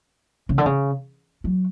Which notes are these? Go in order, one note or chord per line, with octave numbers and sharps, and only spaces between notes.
C#3
D3
C#3
F#3